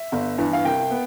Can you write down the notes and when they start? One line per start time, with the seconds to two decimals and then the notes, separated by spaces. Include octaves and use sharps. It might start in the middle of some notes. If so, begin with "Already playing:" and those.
Already playing: E5
0.12 G1
0.38 G2 E3
0.53 F5
0.65 C2 G5
0.91 B3